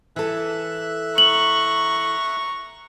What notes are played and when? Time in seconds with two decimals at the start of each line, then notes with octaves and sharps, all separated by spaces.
0.16 E3 A4 E5 F#6
1.18 A#5 C#6 F#7